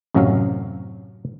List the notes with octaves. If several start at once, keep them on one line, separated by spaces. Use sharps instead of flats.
A1 F#2 C3 F#3 C#4 F5